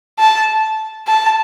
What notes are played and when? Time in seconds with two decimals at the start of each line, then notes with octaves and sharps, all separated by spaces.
0.19 A5
1.07 A5